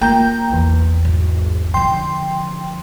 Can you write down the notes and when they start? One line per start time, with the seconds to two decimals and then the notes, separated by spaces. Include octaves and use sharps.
0.01 A#3 F4 G5 A#5 G6
0.50 A1 E2
1.05 G#1
1.74 D3 F3 G5 C6